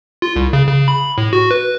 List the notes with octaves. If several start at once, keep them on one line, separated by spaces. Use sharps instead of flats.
F4
C2
C#3
C#3
B5
A2
F#4
B4